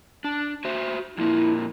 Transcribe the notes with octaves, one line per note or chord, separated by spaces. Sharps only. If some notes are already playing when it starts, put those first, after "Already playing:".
D4
F#4 C5 E5
F2 A#2 A#3 E4